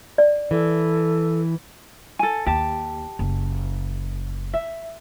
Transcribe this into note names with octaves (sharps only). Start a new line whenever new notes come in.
D5
E3 A4
A4 G#5
D#2 G4 A5
F#1
E5